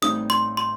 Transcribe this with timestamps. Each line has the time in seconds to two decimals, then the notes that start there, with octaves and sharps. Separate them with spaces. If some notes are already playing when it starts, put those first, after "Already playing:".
0.02 A1 A2 G3 C4 D#4 D#6
0.30 C6
0.57 C6